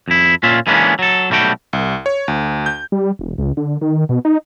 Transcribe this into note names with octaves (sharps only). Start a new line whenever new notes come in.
F2 E4
A#2 C#4 F4 E5
E3 G#3 A#3 B3 C#4 D4
F#3 A4
B1 G3 A3 F#4 G5
C2
C#5
D2
G6
G3
E1
C#2
D3
D#3
B2
D#4